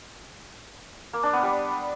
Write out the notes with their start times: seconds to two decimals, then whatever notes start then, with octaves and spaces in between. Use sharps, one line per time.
1.13 A#3
1.23 D4
1.33 B3
1.43 G3